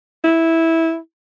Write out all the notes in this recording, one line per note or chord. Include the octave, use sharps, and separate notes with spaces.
E4